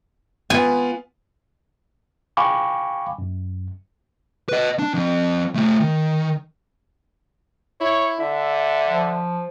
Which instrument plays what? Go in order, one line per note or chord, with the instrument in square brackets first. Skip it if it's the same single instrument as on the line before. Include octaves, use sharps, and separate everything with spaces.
[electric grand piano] B3 F4 B4 [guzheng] G#5
[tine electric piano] F5 G5 G#5 B5 C#6 D6
F#2
[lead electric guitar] B4 D#5
D4
F3 C4
A3 F4
D#3
[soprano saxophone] E4 [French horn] C#5
[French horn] D3 [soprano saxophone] E5
[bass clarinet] F3